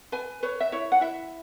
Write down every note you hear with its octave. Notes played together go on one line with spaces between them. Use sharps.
B4 G#5
B4 C#5
E5
E4 C#5
F#5
E4 E5